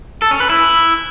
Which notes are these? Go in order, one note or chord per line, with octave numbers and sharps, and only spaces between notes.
A4
C#4
B4
E4